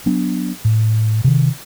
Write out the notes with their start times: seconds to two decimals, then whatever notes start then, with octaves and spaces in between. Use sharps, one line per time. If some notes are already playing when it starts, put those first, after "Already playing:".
0.06 F#3 B3 D4
0.65 A2
1.24 C3 D#3